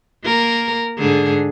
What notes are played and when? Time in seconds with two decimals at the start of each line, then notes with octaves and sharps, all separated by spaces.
0.24 A#3 A#4
0.98 G#2 D3 G#4